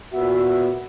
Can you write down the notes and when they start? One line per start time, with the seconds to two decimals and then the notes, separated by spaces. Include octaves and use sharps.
0.13 A#2 B3 F#4 E5